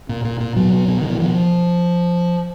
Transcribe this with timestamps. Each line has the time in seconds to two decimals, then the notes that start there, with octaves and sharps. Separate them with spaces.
0.09 A#2
0.25 A#2
0.40 A#2
0.56 B2 F#3
0.72 B2
0.88 B2
1.01 B2 D#3
1.10 E3
1.19 B2 F3